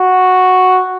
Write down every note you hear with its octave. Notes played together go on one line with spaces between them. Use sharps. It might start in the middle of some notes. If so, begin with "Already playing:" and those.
Already playing: F#4